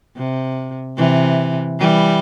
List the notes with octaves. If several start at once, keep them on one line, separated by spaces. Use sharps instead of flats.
C3
C3 E3
E3 G3